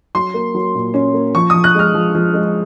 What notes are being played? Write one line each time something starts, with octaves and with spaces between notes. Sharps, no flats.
F#3 C6
A#3
F#3
A#2
C#4
A#3
F3 C#6
F3 D#6
F#6
G#3 F6
F3
F3
G#3